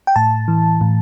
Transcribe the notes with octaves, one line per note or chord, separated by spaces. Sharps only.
G5
A2 A5
E3
A2